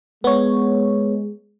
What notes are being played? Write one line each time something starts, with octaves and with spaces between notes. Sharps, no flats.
G#3 B3 C#5